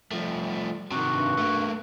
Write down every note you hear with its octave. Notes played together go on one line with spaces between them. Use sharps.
F3 G3 A3
C3 D#3 F#4
G2
A3 A#3